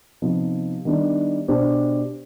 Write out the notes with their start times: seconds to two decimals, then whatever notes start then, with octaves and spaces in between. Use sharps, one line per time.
0.22 C3 F3 B3 D#4
0.85 D#3 G3 B3 D4
1.48 B2 B3 D4 G4 C5